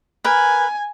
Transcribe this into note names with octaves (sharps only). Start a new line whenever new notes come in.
A#4 B4 G#5